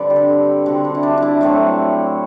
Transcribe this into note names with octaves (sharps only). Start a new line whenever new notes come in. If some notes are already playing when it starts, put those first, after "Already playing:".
Already playing: D3 G3 C4 B4 D5
G4
A4
D3 G3 C4 F#4
D4
E4
D4
D4 E4
A2 F#3 A3 C4